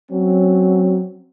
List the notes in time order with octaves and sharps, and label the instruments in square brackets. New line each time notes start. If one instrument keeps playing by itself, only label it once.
[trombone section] F#3 C4 C#4